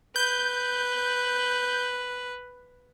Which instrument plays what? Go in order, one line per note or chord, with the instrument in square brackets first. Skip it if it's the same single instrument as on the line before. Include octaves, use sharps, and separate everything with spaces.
[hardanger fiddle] B4 [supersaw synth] G6